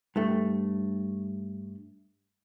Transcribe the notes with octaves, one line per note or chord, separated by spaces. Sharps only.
G2 A3